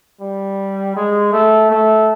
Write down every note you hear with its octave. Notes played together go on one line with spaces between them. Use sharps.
G3
G#3
A3
A3